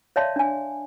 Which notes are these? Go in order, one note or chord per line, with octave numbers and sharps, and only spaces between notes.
C#5 D5 E5 F5 A5 C6
D4 G#5